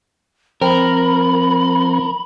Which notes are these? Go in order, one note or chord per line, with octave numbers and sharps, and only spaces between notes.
F3 C4 A#4 B5